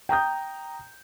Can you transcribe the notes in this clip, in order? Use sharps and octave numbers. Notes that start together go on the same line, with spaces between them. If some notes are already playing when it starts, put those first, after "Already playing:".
G5 A#5 D#6 G6